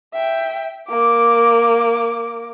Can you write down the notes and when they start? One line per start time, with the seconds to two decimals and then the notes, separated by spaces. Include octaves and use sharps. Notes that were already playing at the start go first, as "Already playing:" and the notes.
0.13 E5 G5
0.89 A#3 D6